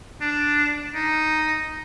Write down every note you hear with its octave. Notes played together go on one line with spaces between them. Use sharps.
D4
D#4